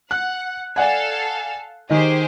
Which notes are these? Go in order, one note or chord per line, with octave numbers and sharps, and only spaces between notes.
F#5 F#6
A4 D5 F5 F#5 G#5
D#3 G4 G#4 C5 D#5